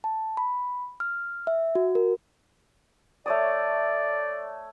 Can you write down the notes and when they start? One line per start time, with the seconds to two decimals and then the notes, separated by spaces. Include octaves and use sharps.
0.04 A5
0.37 B5
1.00 F6
1.47 E5
1.75 F#4
1.95 A#4
3.26 A3 C#5 D5 D#6